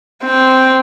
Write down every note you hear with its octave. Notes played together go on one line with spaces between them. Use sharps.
C4